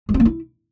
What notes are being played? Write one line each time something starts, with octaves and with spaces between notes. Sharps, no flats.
G#3
C4
A#3
E4